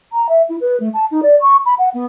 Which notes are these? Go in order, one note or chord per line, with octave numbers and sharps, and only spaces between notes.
A#5
E5
E4
B4
A3
A5
D#4
D5
C#6
B5
F#5
B3